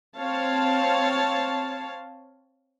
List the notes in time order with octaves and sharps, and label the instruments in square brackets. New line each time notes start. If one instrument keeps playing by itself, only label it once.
[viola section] C4 C#5 F5 A5